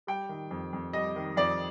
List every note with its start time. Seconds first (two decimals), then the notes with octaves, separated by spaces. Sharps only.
0.07 G3 G5
0.29 D#3
0.51 F2
0.73 F2
0.93 G3 D#5
1.16 D#3
1.37 F2 D5